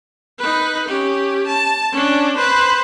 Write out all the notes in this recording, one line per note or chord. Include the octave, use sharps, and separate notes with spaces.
D#4 B4
C#4 G4
A5
C#4 D4
B4 C5